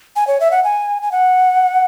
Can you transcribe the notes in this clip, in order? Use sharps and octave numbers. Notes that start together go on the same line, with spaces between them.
G#5
C#5
E5
F#5
G#5
G#5
F#5